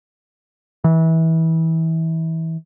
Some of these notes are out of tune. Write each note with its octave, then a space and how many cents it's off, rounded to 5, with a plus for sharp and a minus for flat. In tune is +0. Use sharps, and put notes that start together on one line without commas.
E3 -25